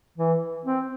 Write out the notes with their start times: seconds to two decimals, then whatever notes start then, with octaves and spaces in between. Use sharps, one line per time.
0.18 E3
0.66 C4